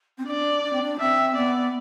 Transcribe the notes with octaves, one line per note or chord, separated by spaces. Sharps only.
C4
D4 D5
D4
C4
D4
C4 E5
B3 D5